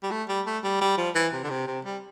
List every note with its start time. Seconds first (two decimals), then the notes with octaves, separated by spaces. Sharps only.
0.03 G3
0.11 A3
0.29 G3
0.46 A3
0.64 G3
0.81 G3
0.97 F3
1.15 E3
1.33 C3
1.43 D3
1.50 C3
1.67 C3
1.85 G3